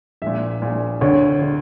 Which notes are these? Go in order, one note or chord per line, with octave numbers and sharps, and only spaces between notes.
A#1 A#2 E5
A#1 A#2
D2 D3 C#5
D3